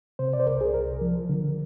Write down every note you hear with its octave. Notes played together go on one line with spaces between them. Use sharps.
C3 C5
D5
C5
C2 A#4
G#4
C2 A#4
F3
D3